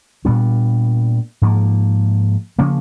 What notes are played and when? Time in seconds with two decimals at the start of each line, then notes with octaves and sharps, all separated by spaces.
0.25 A#2 G3 B3 D4
1.42 G#2 F3 A#3
2.59 C#3 F3 A#3 C#4